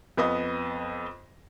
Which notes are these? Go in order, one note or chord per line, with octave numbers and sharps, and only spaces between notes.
F2 B3 D#5 D#6